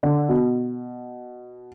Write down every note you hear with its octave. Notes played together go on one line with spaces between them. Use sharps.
D3
B2